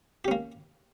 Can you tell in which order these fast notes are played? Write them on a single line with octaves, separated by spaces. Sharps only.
G4 C#4 A#3